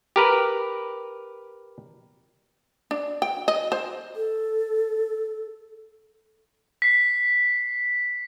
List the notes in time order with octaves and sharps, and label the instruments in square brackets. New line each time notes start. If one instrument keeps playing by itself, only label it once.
[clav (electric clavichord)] G4 A#4 B4
[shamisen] D4
G5
D#5
C5
[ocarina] A4
[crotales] B6 C7